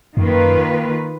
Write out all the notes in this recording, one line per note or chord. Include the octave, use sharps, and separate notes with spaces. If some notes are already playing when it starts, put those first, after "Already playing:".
F#2 D#3 A#3 F4 B4